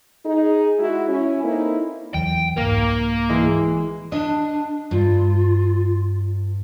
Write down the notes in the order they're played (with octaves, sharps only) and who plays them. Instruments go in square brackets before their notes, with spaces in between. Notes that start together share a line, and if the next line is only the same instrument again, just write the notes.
[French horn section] D#4 G#4
G#3 E4 F#4
C#4 E4
A#3 C4 D#4 E4 A4
[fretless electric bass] E2 E3 F#3 [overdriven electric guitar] G5
[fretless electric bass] C2 G#2 [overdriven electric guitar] A#3 A#4
[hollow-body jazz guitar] E3 G#3
[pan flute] D4 [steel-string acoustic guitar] D#5
[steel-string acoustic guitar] G2 [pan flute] F4